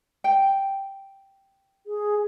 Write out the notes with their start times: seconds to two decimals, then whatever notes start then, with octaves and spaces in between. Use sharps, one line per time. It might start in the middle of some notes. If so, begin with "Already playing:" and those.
0.24 G5
1.87 G#4